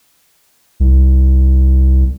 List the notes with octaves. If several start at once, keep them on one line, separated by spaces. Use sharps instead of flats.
C2